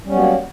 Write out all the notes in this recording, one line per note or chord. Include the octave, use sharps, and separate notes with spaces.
F#3 G3 A#3 B3 C#4